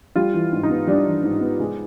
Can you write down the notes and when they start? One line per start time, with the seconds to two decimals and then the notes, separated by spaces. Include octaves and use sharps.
0.16 G3 F4
0.34 E3
0.52 G#2
0.63 D#4
0.70 B3
0.87 G3 D4
1.05 E3
1.24 G#2
1.41 B3
1.60 G#3